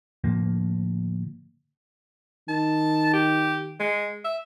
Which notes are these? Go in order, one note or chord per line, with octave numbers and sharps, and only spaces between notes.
A2 D3 F3 A#3
D#3 A5
G4
G#3
E5